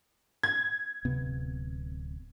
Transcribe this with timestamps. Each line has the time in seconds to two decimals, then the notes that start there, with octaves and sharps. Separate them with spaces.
0.43 G#6
1.05 D1 C3 B3